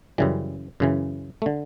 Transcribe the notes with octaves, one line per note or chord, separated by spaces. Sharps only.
F#2 C#3 E3 G3
F#2 C#3 E3
A3
D3